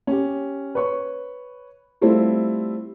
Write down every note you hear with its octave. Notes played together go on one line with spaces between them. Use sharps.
C#4 G4
B4 C#5 C#6
G3 A3 C4 E4 F4